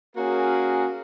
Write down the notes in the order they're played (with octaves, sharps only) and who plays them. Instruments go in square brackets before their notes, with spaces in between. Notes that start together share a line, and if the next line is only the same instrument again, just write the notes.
[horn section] A#3 C#4 F#4 G#4 A#4